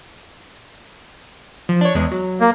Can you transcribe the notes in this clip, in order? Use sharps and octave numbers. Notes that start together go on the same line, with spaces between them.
F3
D4 C#5
E2 G#3
F#3
A#3